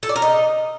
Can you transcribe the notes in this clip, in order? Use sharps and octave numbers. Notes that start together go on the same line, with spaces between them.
A4
D5
A#4
D#4